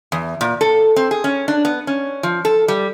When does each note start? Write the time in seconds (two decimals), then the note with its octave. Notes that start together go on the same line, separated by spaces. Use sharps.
0.12 E2
0.41 A#2
0.61 A4
0.96 C4
1.11 G#4
1.24 C#4
1.48 D4
1.65 B3
1.87 C#4
2.23 F3
2.45 A4
2.68 G3